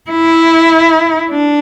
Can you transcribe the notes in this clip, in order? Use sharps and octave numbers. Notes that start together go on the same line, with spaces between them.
E4
D4